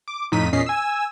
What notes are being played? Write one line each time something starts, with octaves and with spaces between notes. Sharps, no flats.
D6
F2 A2 D#4 B6 D#7
E2 A#2 C#4 D#5 B6 C7
G#5 E6